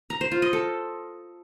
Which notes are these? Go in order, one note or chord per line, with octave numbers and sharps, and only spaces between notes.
A#5
C5
F4
D#5
A4